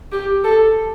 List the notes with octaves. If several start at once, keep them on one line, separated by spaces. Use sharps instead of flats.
G4
A4